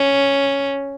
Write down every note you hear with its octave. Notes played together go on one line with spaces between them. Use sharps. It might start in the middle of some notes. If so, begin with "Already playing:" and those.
Already playing: C#4